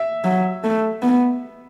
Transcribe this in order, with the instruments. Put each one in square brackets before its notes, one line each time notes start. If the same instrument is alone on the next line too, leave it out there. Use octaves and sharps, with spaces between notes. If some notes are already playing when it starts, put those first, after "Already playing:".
Already playing: [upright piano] E5
[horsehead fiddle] F#3
A3
B3